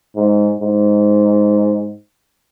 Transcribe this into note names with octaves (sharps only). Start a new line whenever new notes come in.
G#2
G#2